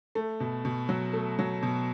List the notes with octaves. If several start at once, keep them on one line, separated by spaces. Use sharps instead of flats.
A3
B2
B2
F#3
A3
F#3
B2